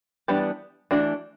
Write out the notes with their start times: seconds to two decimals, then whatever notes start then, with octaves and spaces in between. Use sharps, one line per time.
0.28 E3 G3 B3 D4 G4
0.91 E3 A3 D4 F#4